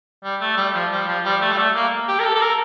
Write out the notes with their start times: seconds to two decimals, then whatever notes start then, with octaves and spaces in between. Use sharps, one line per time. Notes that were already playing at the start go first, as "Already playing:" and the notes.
0.24 G3
0.41 A3
0.57 G3
0.74 F3
0.91 G3
1.07 F3
1.24 G3
1.41 A3
1.51 G3
1.58 A3
1.75 A#3
2.08 G4
2.19 A#4
2.25 A4
2.35 A4
2.41 A#4